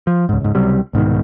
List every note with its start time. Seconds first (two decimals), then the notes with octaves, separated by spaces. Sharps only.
0.07 F3
0.29 C#2 G#2
0.41 C#2 G#2
0.55 C#2 C3 F#3 G3
0.93 C2 G#2 B2 D#3